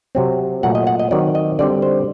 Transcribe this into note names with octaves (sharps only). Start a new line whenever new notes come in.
C3 F#3 C4
A#2 F#3 A3 F#5
D#5
F#5
D#5
D#3 F#3 C4 D5
D#5
D3 G3 C4 D5
C5